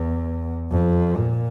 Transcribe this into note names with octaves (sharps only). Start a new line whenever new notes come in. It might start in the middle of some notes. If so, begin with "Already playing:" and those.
Already playing: E2
F2
A#2